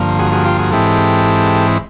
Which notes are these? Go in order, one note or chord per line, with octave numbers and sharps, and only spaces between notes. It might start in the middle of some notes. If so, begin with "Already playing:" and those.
Already playing: G2 D3 F3 A#3
F#4 G#4
F#4 G#4
F4 G4
F#4 G#4
G#2 E3 G#3 C4 E4 G4 A4